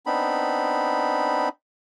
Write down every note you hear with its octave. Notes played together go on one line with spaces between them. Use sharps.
B3 C4 D4 D#4 B5